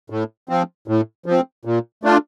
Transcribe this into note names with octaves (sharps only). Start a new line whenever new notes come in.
A2
F3 C4
A2
F3
C4
A#2
A3 D4 F4